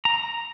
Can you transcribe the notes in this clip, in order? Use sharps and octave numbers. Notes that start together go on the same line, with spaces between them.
A#5